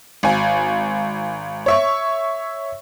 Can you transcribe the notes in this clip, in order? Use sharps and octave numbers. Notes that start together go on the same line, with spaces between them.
G#1 G#5
C#5 E5 C#6